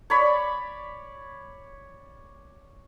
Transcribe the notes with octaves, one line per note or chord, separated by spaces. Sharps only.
C#5 D5 B5